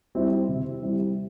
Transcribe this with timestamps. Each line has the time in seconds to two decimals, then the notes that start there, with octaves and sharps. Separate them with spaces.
0.15 G3 C4 E4
0.49 C3
0.83 G3 C4 E4